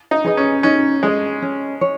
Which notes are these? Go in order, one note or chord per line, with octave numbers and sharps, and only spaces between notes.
D#4
G#4 B4 D#5
C#4
C#4 D#4
G#3 G#4 D#5
C#4
C#5